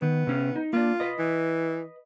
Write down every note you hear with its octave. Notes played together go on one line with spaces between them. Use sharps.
D#3 B3
C3 C#4
D#4
A#3 D4 F4
B4 D#5
E3